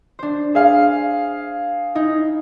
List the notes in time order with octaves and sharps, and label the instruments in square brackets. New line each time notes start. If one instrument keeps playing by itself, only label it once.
[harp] D4 C5
[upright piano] G#4 F5 [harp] E5
[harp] D#4 E4